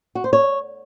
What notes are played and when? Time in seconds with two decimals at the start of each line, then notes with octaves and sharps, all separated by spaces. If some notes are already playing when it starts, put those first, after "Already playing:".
0.15 F#4
0.24 C5
0.33 C#5